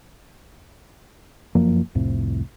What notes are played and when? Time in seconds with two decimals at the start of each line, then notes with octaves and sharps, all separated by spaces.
1.55 F1 F#2 F3 A#3
1.95 C2 F2 A2 C3